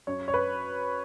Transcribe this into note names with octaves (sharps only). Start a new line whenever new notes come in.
F#2 C#5
C#5
B4